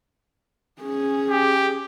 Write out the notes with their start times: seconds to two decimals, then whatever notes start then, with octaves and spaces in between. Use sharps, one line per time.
0.82 C#4 G#4
1.30 G4